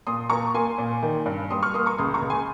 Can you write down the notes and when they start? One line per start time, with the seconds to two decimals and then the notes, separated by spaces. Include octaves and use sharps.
0.07 A#2 C6 D#6
0.30 A#2 A#5 C#6
0.54 A#3 G#5 C6
0.78 A#2
1.03 D#3
1.26 G2
1.50 G3 C6 D#6
1.63 C#6 F6
1.74 A#3 C6 D#6
1.86 A#5 C#6
1.98 C#2 C6 D#6
2.14 A#5 C#6
2.22 C#2
2.30 G#5 C6